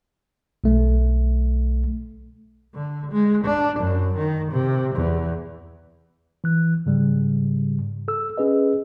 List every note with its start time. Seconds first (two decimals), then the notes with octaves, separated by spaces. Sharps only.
0.64 B1 A3
2.75 D3
3.12 G#3
3.44 D4
3.80 F#2
4.17 D#3
4.52 C3
4.95 E2
6.44 E3 F#6
6.86 G#2 C#3 G3
8.08 A4 E6
8.37 C#4 G#4 B4 D#5